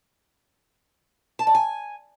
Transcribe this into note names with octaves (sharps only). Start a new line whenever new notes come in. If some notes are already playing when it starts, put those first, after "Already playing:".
A5
D5
G#5